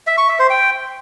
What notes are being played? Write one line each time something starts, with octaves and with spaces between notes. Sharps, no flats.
E5
C#6
E5
C5
G5